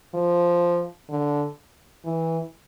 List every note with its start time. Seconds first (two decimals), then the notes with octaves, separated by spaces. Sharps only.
0.14 F3
1.09 D3
2.05 E3